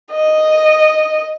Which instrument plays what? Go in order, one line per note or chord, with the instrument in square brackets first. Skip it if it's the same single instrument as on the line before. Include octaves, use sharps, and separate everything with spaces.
[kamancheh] D#5